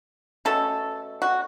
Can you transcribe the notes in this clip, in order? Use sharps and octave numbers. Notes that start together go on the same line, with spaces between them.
B2 A3 C#4 A4
F#4